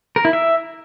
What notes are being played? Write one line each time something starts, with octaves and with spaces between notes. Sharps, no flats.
A#4
E4
E5